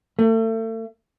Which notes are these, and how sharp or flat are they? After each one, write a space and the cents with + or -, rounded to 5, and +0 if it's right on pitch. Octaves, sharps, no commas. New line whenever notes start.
A3 +35